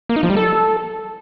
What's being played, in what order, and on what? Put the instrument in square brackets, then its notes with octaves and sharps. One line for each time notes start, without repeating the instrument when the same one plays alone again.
[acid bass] A#3
D#4
F3
G3
A4